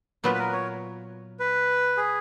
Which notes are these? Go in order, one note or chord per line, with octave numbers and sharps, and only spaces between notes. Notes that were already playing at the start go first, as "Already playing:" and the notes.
A#2 F#3 B3 F4 B4
B4
A#4
C#5
B4
G#4